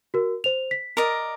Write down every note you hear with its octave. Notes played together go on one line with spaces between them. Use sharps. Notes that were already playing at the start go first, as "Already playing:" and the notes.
F#4 A#4
C5 F7
B6
A#4 D5 D#5